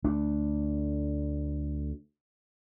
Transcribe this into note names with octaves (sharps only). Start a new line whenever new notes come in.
D2 A3 D4